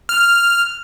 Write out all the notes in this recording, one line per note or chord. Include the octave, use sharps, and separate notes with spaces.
F6